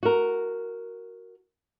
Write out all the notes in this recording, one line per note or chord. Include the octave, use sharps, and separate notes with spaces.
F#4 A#4